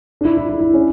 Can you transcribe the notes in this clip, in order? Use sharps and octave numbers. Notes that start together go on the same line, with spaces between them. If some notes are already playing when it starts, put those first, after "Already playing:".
D4
E4
E4
E4
E4
C#4